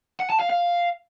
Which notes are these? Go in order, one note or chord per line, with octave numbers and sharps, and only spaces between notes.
F#5
A5
F5
F5